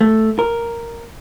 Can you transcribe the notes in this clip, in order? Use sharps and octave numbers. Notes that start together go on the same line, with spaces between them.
A3
A#4